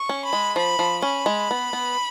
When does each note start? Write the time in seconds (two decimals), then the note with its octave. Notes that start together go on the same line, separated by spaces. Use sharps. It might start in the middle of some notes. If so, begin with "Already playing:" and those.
Already playing: C#6
0.09 C#4
0.24 B5
0.33 G#3
0.56 F3 B5
0.79 F3
1.02 C#4 B5
1.26 G#3
1.51 B3
1.73 B3